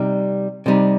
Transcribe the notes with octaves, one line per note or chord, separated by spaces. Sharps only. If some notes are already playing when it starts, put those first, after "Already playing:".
Already playing: C3 G3 D#4
C3 G3 D#4